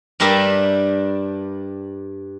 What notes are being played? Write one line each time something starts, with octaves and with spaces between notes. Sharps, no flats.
G2 G3 D4 A#4 E5